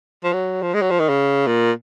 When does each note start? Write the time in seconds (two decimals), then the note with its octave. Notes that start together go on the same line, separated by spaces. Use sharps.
0.24 F3
0.33 F#3
0.62 F3
0.74 G#3
0.82 F#3
0.91 F3
1.00 D#3
1.09 C#3
1.47 A#2